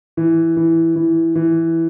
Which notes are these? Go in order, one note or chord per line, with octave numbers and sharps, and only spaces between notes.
E3
E3
E3
E3